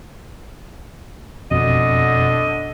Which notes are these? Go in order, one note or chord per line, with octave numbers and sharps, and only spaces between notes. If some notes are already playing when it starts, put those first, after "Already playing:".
A1 F2 B2 D3 D#5